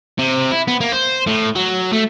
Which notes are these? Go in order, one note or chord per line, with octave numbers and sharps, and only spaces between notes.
C3
E4
B3
A#3
C5
A2
F#3
A3